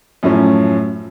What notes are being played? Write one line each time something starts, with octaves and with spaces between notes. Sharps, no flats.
F#2 A2 F3 C#4